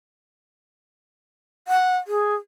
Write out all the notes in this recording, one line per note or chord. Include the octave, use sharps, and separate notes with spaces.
F#5
G#4